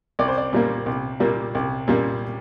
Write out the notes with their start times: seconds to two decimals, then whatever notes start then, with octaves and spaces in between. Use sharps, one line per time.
0.19 C2 D5
0.28 C5
0.38 D5
0.53 A#2 G3 A#3
0.86 C2
1.20 A#2 G3 A#3
1.55 C2
1.88 A#2 G3 A#3